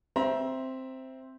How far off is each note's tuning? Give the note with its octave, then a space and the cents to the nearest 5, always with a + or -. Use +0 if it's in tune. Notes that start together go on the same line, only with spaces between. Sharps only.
C4 +0 E5 +0 A#5 +35